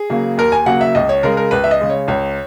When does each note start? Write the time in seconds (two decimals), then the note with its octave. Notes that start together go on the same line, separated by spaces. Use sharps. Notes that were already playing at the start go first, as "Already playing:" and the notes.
Already playing: G#4
0.10 C#3 F#3 A#3
0.38 D#2 A#4
0.52 G#5
0.66 C#3 F#3 A#3 F#5
0.81 E5
0.95 C#2 D#5
1.09 C#5
1.23 C#3 G#3 A#4
1.37 A#4
1.51 C#2 B4
1.64 E5
1.71 D#5
1.81 C#3 G#3
1.90 C#5
2.08 C#2 C#5